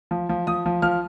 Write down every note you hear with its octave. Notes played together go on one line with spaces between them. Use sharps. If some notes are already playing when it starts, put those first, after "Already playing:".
F3
F3
F3 D#6
F3
F3 F6